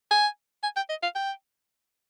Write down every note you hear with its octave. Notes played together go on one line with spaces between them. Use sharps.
G#5
G#5
G5
D#5
F5
G5